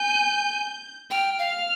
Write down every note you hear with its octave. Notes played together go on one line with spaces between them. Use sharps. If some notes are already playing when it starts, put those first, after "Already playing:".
Already playing: G#5 G6
G5 F6
F5